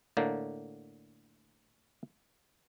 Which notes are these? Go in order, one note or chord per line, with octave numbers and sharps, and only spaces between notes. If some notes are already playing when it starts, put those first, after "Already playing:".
A2 D3 A#3